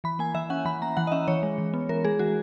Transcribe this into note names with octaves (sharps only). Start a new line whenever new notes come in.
E3 B5
A#3 G#5
E3 E5
C#4 F#5
E3 B5
A#3 A#5
E3 F#5
D#5
C#4 E5
E3 C#5
G#3
E3
B3
E3 A#4
G#3 G#4
E3 F#4